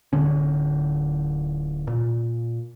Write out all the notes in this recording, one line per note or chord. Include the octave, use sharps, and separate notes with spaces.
D1 D3 C#4
A#2